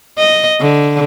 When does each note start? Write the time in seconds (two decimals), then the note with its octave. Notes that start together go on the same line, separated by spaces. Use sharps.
0.18 D#5
0.61 D3